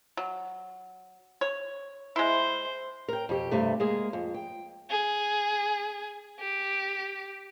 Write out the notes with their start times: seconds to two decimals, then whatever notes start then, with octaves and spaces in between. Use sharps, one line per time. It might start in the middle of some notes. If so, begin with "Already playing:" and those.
0.17 F#3
1.41 C#5
2.16 G#3 E4 C5
3.08 A#4 G5
3.29 F2 B2 G4
3.51 G2 C3 A3
3.80 G#3 A#3 G#4
4.13 F2
4.34 G5
4.90 G#4
6.40 G4